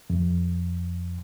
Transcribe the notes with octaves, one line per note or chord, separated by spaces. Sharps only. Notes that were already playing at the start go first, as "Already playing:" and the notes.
F2